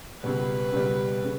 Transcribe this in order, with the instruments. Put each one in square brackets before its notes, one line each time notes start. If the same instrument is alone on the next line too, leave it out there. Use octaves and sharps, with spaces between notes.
[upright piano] C#2 B2 G3 [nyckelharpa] B4
[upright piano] C#2 B2 G3
C#3